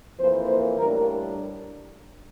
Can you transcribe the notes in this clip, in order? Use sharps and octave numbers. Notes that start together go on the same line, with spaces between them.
F2 E3 A#3 C5
C5
A2 G3 D4 A#4